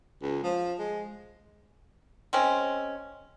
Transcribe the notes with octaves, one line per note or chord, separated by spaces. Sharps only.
C#2
F3
G#3
G#3 C4 C#4